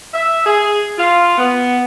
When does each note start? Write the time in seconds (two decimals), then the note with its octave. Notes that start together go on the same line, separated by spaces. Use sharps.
0.13 E5
0.46 G#4
0.98 F4
1.37 B3